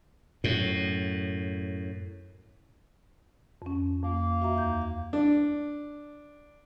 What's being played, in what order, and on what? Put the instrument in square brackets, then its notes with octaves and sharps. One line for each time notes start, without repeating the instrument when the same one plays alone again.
[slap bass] F#2 A2
[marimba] F2 C#4
[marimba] F2 [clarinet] A#3
[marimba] F#4 E5 A#5
D#2 G6
F5
[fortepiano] D4